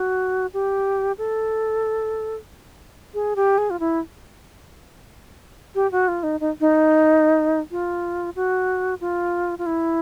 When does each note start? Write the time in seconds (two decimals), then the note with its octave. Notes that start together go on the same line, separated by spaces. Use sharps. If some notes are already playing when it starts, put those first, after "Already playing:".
Already playing: F#4
0.54 G4
1.18 A4
3.14 G#4
3.36 G4
3.58 G#4
3.70 F4
3.80 E4
5.75 G4
5.92 F#4
6.08 F4
6.23 D#4
6.40 D#4
6.60 D#4
7.71 F4
8.36 F#4
9.01 F4
9.59 F4
9.66 E4